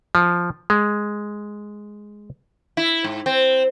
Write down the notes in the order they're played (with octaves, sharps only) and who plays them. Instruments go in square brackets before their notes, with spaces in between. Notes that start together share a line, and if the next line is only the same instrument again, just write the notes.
[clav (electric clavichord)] F3
G#3
[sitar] E4
G#2
C4